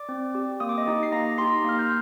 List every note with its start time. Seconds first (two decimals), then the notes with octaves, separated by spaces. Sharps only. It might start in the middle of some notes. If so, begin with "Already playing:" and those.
Already playing: D5 D6
0.09 C4
0.35 G4
0.60 A#3 D#6
0.69 D6
0.78 D#5 D#6
0.86 D#4 G4
1.03 C7
1.12 A#3 A#5 A#6
1.38 D#4 G4 C6 C7
1.64 A#3 F6
1.79 G6